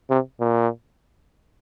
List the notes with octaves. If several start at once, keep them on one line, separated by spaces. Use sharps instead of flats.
C3
A#2